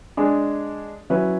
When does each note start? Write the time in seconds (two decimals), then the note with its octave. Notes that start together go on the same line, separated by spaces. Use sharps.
0.17 G#3 D4 G#4
1.10 F#3 C#4 E4 B4 E5